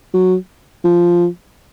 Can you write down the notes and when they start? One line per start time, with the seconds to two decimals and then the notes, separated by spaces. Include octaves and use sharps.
0.14 F#3
0.84 F3